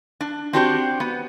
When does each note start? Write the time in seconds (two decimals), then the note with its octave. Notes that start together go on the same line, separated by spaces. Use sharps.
0.21 D4
0.53 C4 D4 F#4 G4 A#4 C5
1.00 B3